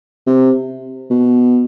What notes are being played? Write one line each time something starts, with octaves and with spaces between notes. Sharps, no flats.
C3
B2